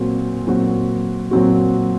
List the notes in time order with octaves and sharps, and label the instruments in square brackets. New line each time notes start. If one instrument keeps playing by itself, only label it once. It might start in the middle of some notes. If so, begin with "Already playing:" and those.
Already playing: [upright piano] A#2 F#3 C4 F#4
A#2 F#3 C4 F#4
A#2 F#3 C4 F#4